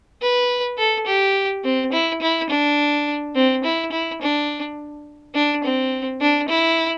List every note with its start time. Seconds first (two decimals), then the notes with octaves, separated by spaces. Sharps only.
0.22 B4
0.78 A4
1.06 G4
1.64 C4
1.92 E4
2.22 E4
2.50 D4
3.35 C4
3.64 E4
3.92 E4
4.21 D4
5.34 D4
5.64 C4
6.21 D4
6.48 E4